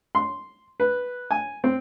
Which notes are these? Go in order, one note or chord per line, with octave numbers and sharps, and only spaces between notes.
C6
B4
G#5
C4